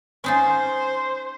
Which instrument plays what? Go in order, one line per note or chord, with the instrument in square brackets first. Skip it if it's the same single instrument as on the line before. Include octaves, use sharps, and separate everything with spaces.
[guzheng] C#4 D#4 F4 [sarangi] C5